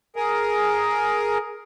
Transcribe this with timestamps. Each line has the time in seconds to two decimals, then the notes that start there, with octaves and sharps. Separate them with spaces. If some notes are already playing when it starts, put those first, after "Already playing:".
0.16 G#4 A#4